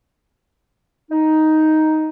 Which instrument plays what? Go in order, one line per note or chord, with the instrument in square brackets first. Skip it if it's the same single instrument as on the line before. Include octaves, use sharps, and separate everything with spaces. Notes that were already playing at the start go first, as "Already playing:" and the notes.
[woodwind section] D#4